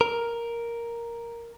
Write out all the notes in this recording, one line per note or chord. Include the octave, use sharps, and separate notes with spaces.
A#4